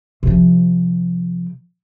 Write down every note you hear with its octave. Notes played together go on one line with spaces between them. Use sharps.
C3 F3